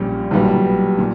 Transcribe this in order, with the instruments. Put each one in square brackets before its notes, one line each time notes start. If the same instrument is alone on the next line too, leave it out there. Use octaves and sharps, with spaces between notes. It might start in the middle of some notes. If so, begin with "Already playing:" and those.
Already playing: [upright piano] A#1 A#2 G3 C#4
B1 A#2 G3 B3
A#2